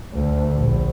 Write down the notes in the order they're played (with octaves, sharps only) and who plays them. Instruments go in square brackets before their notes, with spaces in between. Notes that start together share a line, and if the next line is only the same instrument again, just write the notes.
[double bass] D2
A#1